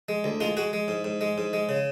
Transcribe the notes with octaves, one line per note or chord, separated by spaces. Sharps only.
G#3
D2
G#3 F4
G#3 F#4
G#3
G#2
G#2
G#3
G#2
G#3
C#3